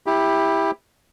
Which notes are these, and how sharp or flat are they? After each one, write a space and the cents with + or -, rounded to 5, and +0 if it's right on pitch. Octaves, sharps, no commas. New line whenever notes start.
E4 -10 G4 +15